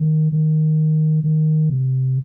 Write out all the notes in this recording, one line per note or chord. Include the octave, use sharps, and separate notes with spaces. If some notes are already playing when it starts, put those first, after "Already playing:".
Already playing: D#3
D#3
D#3
C3